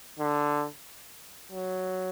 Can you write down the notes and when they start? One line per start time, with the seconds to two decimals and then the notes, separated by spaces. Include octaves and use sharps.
0.19 D3
1.52 F#3